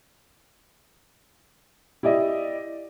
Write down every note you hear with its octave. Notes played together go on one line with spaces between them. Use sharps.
E4 G4 D5 D#5